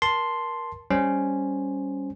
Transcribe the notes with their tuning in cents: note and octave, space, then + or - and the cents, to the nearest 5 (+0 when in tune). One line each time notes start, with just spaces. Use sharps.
A#4 +20 A5 +0 C6 +0
G3 +0 C#4 +0 C5 +0